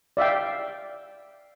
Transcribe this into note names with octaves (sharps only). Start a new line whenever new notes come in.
D5 E5 F5 G5